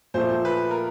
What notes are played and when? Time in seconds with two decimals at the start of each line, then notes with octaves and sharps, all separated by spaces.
0.14 A#2 F3 A3 C5
0.45 B4
0.71 A#4